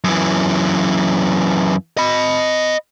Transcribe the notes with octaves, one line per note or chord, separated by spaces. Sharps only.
F#2 E3
D#5 B5